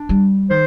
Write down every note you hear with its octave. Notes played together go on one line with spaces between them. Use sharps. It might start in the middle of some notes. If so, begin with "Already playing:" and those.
Already playing: D4
G3
D#3 C5